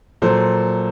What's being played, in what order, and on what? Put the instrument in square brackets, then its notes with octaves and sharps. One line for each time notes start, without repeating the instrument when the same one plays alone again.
[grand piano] A#2 F#3 A4 C5